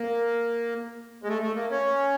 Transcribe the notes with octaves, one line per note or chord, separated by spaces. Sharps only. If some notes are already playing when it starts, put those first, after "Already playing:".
Already playing: A#3
G#3
A3
A3
A#3
C#4